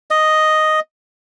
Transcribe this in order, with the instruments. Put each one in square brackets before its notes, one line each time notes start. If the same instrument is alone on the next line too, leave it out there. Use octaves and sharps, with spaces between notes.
[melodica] D#5